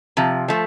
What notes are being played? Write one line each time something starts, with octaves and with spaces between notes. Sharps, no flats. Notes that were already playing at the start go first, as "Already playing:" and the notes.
C3 F3
F3 A3